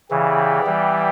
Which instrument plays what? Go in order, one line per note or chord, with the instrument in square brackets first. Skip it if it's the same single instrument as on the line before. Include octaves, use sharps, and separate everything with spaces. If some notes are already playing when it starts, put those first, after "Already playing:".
[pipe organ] C#3 E3 [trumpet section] B3 E4 G4 D5 G5
[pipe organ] E3 G3